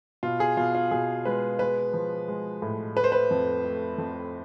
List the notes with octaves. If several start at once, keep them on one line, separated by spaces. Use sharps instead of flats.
B2 F4
G#4
B2 F4
F4
B2 G#4
G#3 B4
G#3 B4
F3
G#3
A2
A3 B4
C5
B4
F2
A3
F2